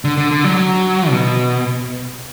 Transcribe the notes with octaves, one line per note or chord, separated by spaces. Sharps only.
D3
D3
D3
F#3
F#3
B2